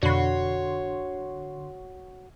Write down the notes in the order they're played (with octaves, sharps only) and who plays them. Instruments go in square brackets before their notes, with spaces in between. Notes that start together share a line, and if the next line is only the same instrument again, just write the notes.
[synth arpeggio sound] F2 B2 B5 [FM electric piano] D3 C6 [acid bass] F#4 [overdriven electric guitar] C#5